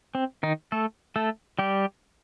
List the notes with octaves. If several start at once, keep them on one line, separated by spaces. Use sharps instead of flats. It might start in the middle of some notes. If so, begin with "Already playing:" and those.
C4
D#3 D#4
A3 A4
A3 A4
G3 G4